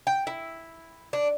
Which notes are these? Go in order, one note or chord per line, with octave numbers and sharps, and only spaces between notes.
G5
E4
D4